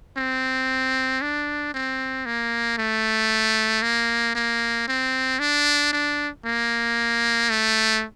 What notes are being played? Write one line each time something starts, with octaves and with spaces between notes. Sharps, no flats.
C4
D4
C4
A#3
A3
A#3
A#3
C4
D4
D4
A#3
A3